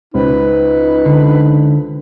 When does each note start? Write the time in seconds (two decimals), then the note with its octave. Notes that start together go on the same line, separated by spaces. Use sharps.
0.14 C#2 D#4 B4 C5
1.06 D3